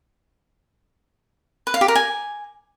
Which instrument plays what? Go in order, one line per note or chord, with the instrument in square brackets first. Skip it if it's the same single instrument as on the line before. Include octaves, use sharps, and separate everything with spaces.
[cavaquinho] B4
F5
G4
A#4
G#5